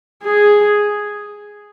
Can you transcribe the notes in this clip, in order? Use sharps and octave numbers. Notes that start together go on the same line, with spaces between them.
G#4